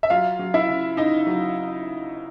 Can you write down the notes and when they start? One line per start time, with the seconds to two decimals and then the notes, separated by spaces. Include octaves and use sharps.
0.03 E5
0.10 F#3 F4 F5
0.39 F#3
0.54 E4 E5
0.69 C#3
0.97 C#3 D#4 D#5
1.27 F#3